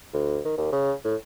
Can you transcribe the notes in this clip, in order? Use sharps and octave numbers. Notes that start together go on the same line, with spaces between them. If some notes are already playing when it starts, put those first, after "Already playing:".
D2
D#3
D#2
C#3
A2